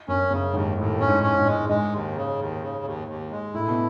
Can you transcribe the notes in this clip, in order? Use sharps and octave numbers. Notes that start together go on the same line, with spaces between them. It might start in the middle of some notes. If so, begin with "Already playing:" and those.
F#2 C#4
F#2 C#3
D#2 G#2
D#2 A2
C#4
G#2
C#4
G#2
G#3
G#2 G#3
D#2
C#3
D#2
C#3
D#2
D#2
G#3
A2 E4
B2